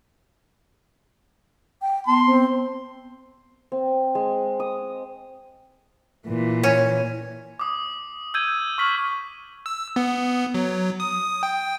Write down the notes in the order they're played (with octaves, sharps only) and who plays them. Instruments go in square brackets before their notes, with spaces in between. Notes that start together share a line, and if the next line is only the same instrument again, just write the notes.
[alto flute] G5
[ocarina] B3 [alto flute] A5 [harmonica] C6
[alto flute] C4
[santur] C4
G#3
D#6
[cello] A#2 E3
[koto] C#4
[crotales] D6 D#6
E6 G6 G#6 D#7
C#6 F6 B6 F#7
[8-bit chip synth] E6
B3
F#3
D#6
G5